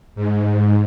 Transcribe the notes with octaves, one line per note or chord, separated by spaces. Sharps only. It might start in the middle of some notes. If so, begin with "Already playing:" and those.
G#2